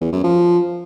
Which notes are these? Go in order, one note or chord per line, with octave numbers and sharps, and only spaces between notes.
E2
F#2
F3